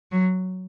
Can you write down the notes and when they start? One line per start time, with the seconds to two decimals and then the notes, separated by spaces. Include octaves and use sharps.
0.12 F#3